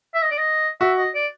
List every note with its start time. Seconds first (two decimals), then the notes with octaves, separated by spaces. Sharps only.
0.15 E5
0.22 D#5
0.31 D5
0.38 D#5
0.81 F#4 E5
0.98 D#5
1.15 D5